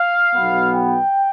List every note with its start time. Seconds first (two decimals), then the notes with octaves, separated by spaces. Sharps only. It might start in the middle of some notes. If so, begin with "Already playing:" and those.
Already playing: F5
0.34 B1 B2 B3
0.73 G5